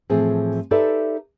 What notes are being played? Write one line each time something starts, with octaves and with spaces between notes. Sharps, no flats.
A2 E3 F3 C4 G#4
D#4 G4 A4 B4 D5 E5